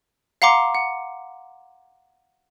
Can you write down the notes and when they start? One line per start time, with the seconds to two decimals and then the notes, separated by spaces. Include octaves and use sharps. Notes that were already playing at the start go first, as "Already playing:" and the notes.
0.42 F5 F#5 A#5 C6 D6
0.75 F#5